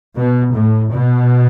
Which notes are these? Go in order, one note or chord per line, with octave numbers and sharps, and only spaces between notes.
B2
A2
B2